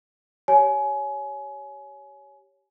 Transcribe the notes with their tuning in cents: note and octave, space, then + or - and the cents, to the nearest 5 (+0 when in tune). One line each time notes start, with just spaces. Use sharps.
G4 -10 C#5 +10 G#5 +25